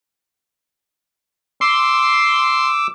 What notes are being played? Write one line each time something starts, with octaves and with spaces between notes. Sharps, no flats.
C6 D6 E6